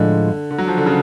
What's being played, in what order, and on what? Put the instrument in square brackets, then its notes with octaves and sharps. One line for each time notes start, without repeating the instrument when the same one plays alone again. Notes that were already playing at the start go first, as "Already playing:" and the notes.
Already playing: [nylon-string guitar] A2 F3 G#3 D4 F4 [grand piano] D3
[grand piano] D3
F#3
F3
D3
C#3